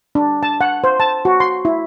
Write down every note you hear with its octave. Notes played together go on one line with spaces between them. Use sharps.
D4
A5
F#5
C5
A5
F#4
C6
E4